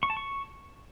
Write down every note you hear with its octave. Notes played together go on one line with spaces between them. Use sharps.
C#6
A5
C#6